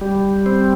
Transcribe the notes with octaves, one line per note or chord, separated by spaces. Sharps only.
G3
C4